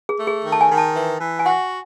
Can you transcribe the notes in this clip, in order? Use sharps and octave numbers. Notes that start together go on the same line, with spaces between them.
G#4
A3
G#4
D#3
A5
G#5
D#3
A5
E3
E3
G#5
F#4 F#5